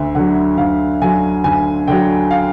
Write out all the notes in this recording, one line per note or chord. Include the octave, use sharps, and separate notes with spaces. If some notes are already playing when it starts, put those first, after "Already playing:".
Already playing: D2 E5
D3 F#3 F#5
D2 F5
D3 F#3 G#5
D2 G#5
D3 F#3 G5
F5